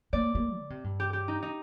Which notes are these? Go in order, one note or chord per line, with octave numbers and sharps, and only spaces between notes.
A#3 D5
A#3
D3
C3
G2
G4
G4
D#4
D#4